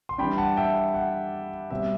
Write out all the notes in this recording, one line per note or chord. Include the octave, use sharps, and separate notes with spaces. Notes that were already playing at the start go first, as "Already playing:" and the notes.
C6
E3 G3 D4 G5 B5
F#5 A5
E5 G5
F#5
B2 G3 C4 E5